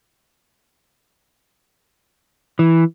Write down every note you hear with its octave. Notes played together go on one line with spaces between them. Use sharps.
E3